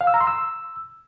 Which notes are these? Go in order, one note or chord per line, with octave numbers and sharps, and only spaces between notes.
F5
E6
A#5
C6
E6